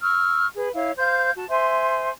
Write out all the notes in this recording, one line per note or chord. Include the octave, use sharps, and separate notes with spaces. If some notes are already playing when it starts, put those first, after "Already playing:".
C#6 E6 F6
G#4 B4
E4 C#5 F5
C5 F5 G6
F#4 A5
C5 E5 G#5 C6